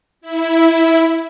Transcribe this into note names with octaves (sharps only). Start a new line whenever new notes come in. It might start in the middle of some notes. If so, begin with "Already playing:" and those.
E4